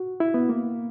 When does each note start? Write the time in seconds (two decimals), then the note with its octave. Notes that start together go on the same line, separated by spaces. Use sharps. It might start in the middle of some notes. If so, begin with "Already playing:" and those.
Already playing: F#4
0.20 E4
0.34 B3
0.49 A#3